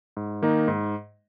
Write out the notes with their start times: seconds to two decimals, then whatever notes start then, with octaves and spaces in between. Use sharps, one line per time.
0.17 G#2
0.42 D#3 A#3 D#4
0.68 G#2